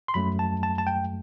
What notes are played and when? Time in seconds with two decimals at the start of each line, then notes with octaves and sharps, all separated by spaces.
0.08 C6
0.14 F#2 F#3 A3 B5
0.39 A5
0.63 A5
0.78 A5
0.87 G5